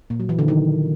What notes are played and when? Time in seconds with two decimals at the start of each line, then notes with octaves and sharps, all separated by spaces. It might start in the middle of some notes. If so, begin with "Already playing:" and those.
0.10 A#2
0.20 F#3
0.29 E3
0.39 D3
0.48 D#3